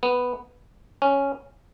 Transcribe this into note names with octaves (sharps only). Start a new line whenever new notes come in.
B3
C#4